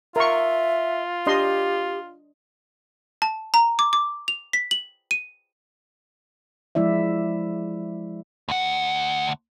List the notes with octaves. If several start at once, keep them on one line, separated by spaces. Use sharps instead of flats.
F4 A#4 E5 C#6
D4 G4 D#5 C6
A5
A#5
D6
D6
F7
B6
F#7
D#7
F3 G#3 E4 D5 E5
D2 F#5